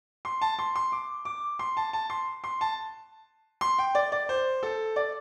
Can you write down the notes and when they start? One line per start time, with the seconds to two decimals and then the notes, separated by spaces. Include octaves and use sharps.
0.25 C6
0.42 A5
0.59 C6
0.75 C6
0.92 D6
1.25 D6
1.59 C6
1.77 A5
1.93 A5
2.10 C6
2.44 C6
2.61 A5
3.61 C6
3.79 G5
3.95 D5
4.12 D5
4.29 C5
4.63 A4
4.96 D5